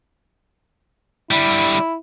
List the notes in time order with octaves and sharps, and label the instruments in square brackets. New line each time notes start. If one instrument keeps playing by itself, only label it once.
[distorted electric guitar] D3 G3 [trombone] E4